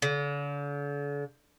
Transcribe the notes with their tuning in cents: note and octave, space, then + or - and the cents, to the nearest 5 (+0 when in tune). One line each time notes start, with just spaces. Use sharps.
D3 -40